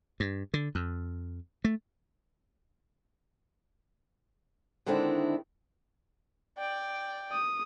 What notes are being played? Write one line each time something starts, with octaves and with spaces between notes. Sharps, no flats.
G2
D3
F2
A3
D3 D#3 G#3 C4 D4 E4
D5 G5
D#6